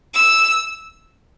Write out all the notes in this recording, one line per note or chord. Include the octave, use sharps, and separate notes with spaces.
E6